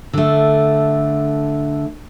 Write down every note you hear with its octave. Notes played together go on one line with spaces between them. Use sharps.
D3 A3